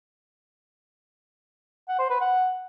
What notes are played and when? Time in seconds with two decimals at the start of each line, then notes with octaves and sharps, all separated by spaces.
1.88 F#5
1.99 C5
2.10 B4
2.21 F#5